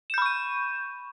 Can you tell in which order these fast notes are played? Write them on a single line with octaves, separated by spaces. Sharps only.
E7 G6 B5 C#6 D#7